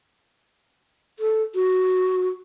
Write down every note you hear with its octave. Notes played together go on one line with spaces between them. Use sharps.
A4
F#4